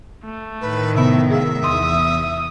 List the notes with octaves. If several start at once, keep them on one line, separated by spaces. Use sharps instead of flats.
A3
A2 D#3 B4
C3 B3 E5
G#4 E5 F5
E2 C6 D#6